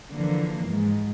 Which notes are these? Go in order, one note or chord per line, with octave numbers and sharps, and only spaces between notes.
D3 E3 F3 A#3
G#2